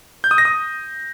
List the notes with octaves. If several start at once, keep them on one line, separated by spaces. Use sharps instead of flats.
G6
D#6
A#6
D#6